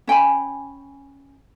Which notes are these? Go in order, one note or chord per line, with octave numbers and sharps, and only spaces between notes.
C#4 G5 G#5 B5